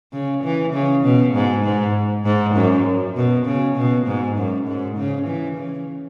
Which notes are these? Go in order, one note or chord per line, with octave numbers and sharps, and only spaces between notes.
C#3
E3
C#3
B2
G#2
G#2
G#2
F#2
B2
C#3
B2
G#2
F#2
G#2
C#3
E3
C#3